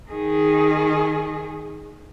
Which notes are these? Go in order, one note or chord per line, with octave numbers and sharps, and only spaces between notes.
D#3 G#4